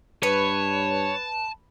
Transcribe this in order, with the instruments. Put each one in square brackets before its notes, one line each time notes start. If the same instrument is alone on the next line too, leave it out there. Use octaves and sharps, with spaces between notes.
[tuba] G2 [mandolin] B4 [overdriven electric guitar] C#5 [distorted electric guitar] A5